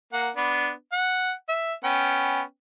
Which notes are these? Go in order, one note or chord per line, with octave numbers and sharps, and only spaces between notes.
A#3 F#5
B3 D4
F#5
E5
B3 C#4 G5